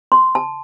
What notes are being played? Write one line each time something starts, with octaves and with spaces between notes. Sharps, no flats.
C6
A5